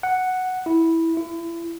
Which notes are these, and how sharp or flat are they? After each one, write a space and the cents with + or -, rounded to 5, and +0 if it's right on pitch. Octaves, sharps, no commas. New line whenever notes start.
F#5 +0
E4 -10
E4 +30